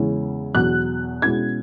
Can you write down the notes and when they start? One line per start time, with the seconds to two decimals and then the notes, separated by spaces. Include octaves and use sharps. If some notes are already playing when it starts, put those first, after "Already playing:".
Already playing: E2 C#3 G#3 C#4 E4
0.54 E2 B2 F#3 F#6
1.22 B2 G#3 C#4 E4 G#6